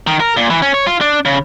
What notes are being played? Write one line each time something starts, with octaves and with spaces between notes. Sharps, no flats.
D#3
A#4
A#2
E3
C#4
C#5
F4
D4
C#3